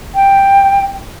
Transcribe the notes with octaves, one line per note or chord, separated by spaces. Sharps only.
G5